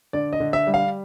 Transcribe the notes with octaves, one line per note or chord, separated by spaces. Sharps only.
D3 D5
D#5
D3
E5
G3
F5